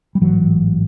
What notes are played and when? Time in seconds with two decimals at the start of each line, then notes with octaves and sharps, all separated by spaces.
0.15 G3
0.21 A1 G#2 E3 F#3